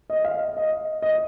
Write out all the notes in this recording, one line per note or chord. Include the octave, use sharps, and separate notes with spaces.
D#5
F5
D#5
D#5